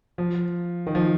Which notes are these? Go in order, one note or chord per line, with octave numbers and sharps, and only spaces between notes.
F3
D#3
F3